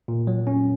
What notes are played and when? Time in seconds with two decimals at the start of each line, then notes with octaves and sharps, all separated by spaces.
0.08 A#2
0.27 F#3
0.47 C#4